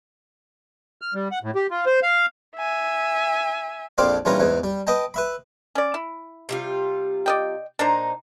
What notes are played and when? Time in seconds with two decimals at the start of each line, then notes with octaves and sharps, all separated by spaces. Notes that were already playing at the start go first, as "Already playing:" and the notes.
1.02 F6
1.14 G3
1.31 F#5
1.43 A2
1.55 G4
1.71 F4
1.86 C5
2.03 F5
2.56 E5 G#5
3.98 A#1 F2 C4 C5 D5 F5
4.25 A#1 E3 G3 C#4 F4 A#5
4.40 E2 G#2 E3
4.64 G3
4.87 B4 D#5 G5 A5
5.14 B4 E5 B5
5.75 C#4 D5
5.94 E4
6.49 C3 G3 F4
7.26 D5 D#5 G5
7.79 A#2 D4 D#4 C5 A#5